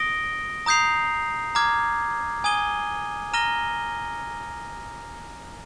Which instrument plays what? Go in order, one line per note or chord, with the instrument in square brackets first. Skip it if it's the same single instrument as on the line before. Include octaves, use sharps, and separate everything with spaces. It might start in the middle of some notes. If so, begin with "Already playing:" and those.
Already playing: [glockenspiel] D#6 A#6 D7 G7
A#5 D#6 G6 C7 F7
A#5 D6 F6 G#6
G#5 D#6 G#6 D#7 G7
A#5 F6 A#6 D#7 G7